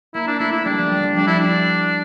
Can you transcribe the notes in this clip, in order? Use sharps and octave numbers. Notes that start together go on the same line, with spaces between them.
A#3 E4
D4
A3 E4
E4
G3 D4
F3
G3
F3
G3 D4
E4
D4 E4